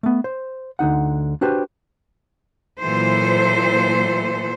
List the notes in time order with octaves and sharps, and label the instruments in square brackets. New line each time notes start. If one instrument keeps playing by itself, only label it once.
[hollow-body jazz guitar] A3 B3
C5
D2 D3 D#4 F#5
D4 F#4 G4 B4 C5
[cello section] A#2 E3 F#3 A4 C5